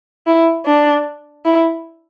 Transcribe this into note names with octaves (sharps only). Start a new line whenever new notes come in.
E4
D4
E4